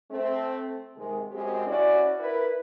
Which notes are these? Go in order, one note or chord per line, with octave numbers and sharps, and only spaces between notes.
A3 C4
C3 D#3 G#3
F#2 G#3 C4 G4
C#4 E4 F#4 D5
E4 A#4 B4